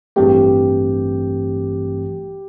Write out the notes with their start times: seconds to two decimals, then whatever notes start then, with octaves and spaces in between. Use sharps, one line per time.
0.16 A1 G2 E3 A3 C4 G4